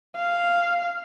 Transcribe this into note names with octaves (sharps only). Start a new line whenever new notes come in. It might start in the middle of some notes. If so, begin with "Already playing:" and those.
F5